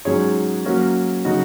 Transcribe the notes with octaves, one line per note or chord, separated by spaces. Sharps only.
G#2 F#3 C#4 G#4 C#5
F#3 A#3 C#4 F#4
C#3 F#3 D#4 F#4